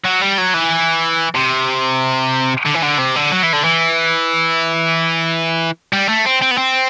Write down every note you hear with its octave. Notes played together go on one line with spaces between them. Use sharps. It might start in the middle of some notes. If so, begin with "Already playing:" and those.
F#3
G3
F#3
E3
C3
D3
E3
D3
C3
D3
F#3
E3
D3
E3
G3
A3
C4
C4
B3
C4